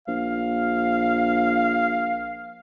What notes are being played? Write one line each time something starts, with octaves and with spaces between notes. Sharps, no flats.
A#1 F5